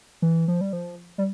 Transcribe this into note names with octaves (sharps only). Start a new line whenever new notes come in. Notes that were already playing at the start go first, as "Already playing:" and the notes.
E3
F3
G3
F3
G3